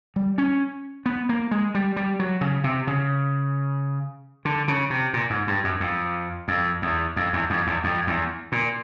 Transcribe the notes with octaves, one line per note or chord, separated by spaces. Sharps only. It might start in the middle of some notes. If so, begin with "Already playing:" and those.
G3
C#4
B3
A#3
G#3
G3
G3
F#3
C#3
C3
C#3
D3
C#3
C3
A#2
G#2
G2
F#2
F2
F2
E2
F2
E2
F2
E2
F2
E2
A#2